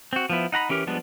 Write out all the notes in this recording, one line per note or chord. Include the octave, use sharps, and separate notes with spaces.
C4 F#4
F3 B3 E4
D#4 F#5 A#5 B5
E3 C#4 G4 A#4
F3 G3 G#3 B3 D4